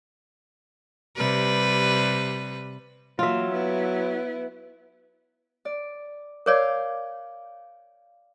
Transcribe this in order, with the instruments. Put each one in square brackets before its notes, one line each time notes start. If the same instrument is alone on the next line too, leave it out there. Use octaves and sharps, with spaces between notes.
[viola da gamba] C3 G3 B4
[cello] E3 A#3 [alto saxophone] F#3 [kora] F4 E5
[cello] B3 E4 [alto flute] B4
[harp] D5
[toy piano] A#4 C#5 D5 [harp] F5 D6 G6